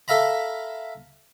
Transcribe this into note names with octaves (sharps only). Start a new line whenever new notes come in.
A4 E5 F5 A#5 B5